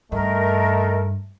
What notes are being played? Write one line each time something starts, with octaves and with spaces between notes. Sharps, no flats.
G2 D#3 A3 A#4